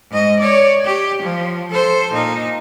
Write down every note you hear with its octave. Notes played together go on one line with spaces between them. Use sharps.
G#2 D#5
C#5 D5
G4
F3
A4 C5
A#2 D#4